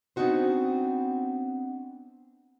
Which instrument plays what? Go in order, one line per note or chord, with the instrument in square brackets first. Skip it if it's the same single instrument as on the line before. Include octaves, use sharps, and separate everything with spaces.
[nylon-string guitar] B3 C4 D4 D#4 F#4 C5